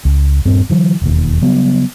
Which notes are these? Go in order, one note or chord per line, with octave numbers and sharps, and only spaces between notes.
C#2
D#1 G2 C4
D3 E3 F#3
E1 D#2
C#3 F#3 G3 B3